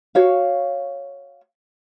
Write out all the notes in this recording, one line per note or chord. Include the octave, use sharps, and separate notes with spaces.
F#4 C#5 F5